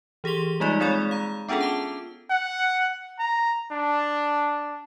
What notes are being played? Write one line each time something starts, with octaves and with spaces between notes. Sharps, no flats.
E3 G4 G#4 C6 G7
G3 G#3 A#3 D#4 F4 D5
G#3 C4 G#4 C#5 D5
F5 A#5
B3 C#4 D4 F4 G#4 A4
A5 D6
F#5
A#5
D4